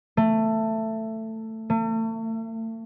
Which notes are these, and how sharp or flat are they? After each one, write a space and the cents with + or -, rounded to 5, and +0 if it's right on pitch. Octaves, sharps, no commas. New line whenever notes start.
A3 +15
A3 +40